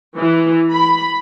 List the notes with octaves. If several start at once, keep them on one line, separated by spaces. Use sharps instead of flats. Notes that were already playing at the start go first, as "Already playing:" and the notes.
E3
B5